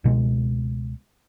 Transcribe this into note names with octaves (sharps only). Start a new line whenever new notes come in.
C#2 B2 G#3